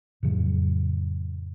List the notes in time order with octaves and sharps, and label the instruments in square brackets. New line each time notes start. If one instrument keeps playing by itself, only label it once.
[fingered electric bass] F2 A2 C#3 F#3